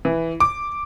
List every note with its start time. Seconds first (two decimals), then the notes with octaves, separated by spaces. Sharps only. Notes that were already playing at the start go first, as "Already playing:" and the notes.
0.05 E3
0.40 D6